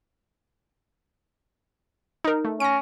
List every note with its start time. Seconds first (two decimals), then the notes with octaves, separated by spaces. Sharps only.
2.24 D#4 A#4
2.45 A3
2.60 C#4 A#6 D7